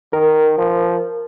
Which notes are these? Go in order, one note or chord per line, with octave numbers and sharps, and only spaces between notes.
D#3 A#4
F3